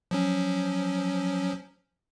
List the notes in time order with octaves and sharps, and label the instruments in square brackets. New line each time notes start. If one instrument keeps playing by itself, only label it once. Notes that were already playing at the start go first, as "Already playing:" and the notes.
[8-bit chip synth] F3 F#3 C#4